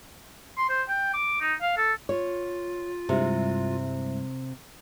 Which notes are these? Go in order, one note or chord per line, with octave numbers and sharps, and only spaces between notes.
C6
C5
G5
D6
D#4
F5
A4
F4 C#5
G2 C3 G3 G#3 E4 C5 E5